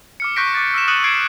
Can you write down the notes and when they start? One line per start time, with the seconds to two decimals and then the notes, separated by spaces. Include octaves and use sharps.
0.20 D6 F6 C#7
0.36 C#6 F#6 G6 A#6 B6 D7
0.55 D6 A6
0.74 E6 F6 B6 E7
0.88 D#6 F#6 C#7 D#7 E7 F#7
1.04 F#6 G#6 C7 D7